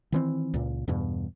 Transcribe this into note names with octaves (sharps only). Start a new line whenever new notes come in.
D#3 E3 C4
C#2 A#2
E2 G2 B2